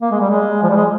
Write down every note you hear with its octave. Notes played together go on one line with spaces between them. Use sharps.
A#3
G#3
G3
G#3
F3
G3
G#3